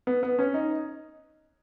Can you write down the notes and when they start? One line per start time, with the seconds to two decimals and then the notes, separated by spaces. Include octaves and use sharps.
0.07 B3
0.23 B3
0.39 C#4
0.54 D#4